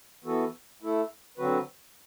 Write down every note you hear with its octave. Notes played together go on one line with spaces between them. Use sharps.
E3 B3 F#4 A4
A3 E4 A4
D3 F#3 C4 F#4 B4